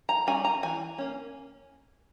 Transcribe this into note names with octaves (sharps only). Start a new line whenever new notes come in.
A#5
G3 C#4 G#5
A#5
E3 G#5
A#3 C#4